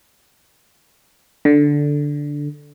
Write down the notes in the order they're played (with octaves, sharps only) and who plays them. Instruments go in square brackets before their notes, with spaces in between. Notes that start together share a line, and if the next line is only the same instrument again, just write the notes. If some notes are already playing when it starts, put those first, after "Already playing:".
[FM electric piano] D3